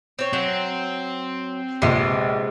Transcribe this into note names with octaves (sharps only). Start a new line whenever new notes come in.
C4 C#5
F#3 C4
A#1 C3 G#3 B3 C7